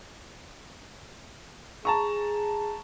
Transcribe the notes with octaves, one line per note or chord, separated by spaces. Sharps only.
G#4 A5 A#5 C#6